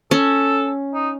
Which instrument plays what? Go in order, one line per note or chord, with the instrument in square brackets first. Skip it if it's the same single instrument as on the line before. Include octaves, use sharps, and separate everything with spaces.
[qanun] C#4 [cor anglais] A4
[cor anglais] D#4